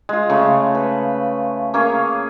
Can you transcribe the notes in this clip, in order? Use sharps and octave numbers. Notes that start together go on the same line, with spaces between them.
G#3 F4
C#3 A3
B4
A#3 C#4 G#4